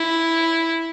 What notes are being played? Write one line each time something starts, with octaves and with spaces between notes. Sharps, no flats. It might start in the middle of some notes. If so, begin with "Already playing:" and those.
Already playing: E4